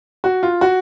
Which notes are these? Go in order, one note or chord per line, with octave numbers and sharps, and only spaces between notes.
F#4
F4
F#4